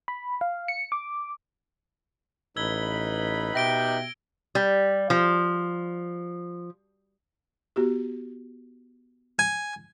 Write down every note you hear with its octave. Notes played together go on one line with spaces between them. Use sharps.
B5
F5
C#7
D6
A1 D#4 B4 B5 E6 G#6 G7
B2 G4 E5 G5 A#6 D7 G7
G3
F3
B3 F#4 G4
G#5